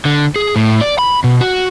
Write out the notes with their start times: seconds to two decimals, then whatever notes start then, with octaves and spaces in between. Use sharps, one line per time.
0.05 D3
0.36 G#4
0.56 A2
0.81 D5
0.99 B5
1.24 B2
1.41 F#4